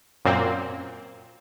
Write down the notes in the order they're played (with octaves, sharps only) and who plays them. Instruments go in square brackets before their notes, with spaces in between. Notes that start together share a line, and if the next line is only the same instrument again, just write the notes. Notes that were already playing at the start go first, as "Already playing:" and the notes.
[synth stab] F#2 A#2 A#3 C4